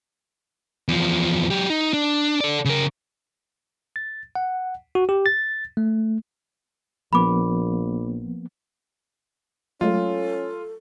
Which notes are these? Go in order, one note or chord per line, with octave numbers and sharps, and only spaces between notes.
E2 F3
F#3 G4
D#4
D4
A4 D5
C#3 A#4
A6
F#5
F#4
G4
A6
A3
A#1 F3 A#3 B3 B5 D6
F#3 G#3 A3 C#4 F4 A4